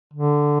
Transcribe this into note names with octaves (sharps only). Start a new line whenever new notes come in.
D3